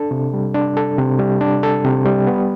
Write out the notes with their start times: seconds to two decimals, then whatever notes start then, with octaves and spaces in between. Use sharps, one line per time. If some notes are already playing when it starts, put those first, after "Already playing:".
Already playing: D4 A4
0.11 C3
0.33 G3
0.54 D4
0.77 A4
0.98 C3
1.19 G3
1.41 D4
1.63 A4
1.84 C3
2.06 G3
2.27 B3